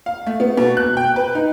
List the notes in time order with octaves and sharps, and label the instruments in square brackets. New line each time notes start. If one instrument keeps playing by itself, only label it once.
[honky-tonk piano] F5
A3
B3
B2
F#6
G5
B4
D#4